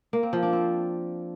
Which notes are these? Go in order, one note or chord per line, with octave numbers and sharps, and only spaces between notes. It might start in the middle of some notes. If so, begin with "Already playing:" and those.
A#3
C4
F3
D4
C4